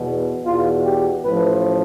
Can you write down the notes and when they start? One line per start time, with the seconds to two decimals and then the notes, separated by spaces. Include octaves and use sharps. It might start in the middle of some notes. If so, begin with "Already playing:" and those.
Already playing: E2 B2
0.44 E2 B2 F4
0.83 G4
1.24 A1 A2 F3 B4